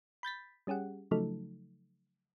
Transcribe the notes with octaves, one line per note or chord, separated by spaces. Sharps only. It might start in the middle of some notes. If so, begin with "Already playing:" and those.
B5 G6 A6 B6
G3 C#4 G4 G#4 F#5
C#3 F3 F#3 A3 D#4 A4